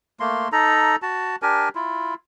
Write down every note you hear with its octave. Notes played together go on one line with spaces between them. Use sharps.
A3 A#3 C6
D#4 A4 A#5
F#4 A5
D4 G4 A#4 G#5
E4 F4